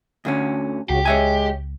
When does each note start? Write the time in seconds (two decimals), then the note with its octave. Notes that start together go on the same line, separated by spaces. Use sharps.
0.25 D2 D3 C#4
0.89 C#2 C#3 F#4 G4
1.05 G#3 C#5 E5 G#5